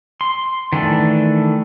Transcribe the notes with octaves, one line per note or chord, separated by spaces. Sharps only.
C6
D#3 E3 A3 D4